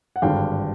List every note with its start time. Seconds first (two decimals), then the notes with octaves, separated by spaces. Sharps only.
0.16 F#5
0.22 G#1 G2 D3 F5 G5